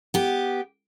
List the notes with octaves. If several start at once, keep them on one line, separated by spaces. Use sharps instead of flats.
B3 G4